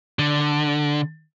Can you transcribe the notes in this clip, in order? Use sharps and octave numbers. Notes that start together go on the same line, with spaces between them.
D3